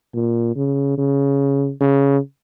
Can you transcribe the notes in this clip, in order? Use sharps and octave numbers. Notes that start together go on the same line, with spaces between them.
A#2
C#3
C#3
C#3